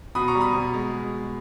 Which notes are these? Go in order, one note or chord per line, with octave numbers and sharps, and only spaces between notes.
B2 B5 D#6
A#5 C#6
G3
B5 D#6
B2
G#3